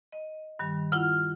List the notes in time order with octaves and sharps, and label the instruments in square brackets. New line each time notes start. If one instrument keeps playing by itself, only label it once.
[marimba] D#5
G2 D#3 G3
[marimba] E4 F4 F#5 [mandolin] F6